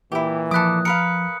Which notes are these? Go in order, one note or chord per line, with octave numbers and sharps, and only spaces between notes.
A#2 E3 E4 G4
F3 A4 B5 D6 D#6 F#6
A#4 B4 F5 C#7